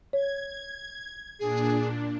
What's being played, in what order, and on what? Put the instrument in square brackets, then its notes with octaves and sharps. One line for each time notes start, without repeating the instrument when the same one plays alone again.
[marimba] C#5 [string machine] G#6
[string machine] A#2 D4 [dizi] G#4